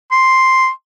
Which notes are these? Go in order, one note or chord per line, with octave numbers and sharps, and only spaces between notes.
C6